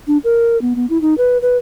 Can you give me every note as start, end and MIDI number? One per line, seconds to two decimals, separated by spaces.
0.07 0.18 62
0.24 0.60 70
0.62 0.73 59
0.76 0.86 59
0.90 1.00 64
1.02 1.14 63
1.18 1.38 71
1.42 1.57 71